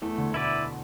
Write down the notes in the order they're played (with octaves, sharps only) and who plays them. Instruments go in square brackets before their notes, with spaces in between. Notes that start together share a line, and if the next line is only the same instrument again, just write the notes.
[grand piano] E2 E3 [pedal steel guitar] A3
[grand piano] D2 D3
[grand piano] B2 [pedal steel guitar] E4 B4 D5